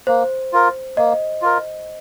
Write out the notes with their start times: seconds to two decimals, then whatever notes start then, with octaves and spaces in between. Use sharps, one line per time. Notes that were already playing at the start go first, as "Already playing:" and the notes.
0.07 A#3 C5
0.53 F4 A#4
0.97 A#3 D#5
1.42 F4 A#4